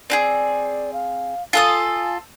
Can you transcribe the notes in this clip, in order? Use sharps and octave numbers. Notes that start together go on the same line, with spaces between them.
C4 G4 G#4 D5
F5
F4 A4 G#5 D#6